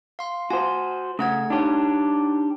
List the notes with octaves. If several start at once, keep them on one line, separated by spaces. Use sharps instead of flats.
F5 C6
F#4 C5 G#5
C#3 A3 F#5 G#6
D4 D#4 G4 C#5